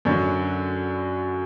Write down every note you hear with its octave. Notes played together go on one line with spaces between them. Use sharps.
F#2 D3 F#3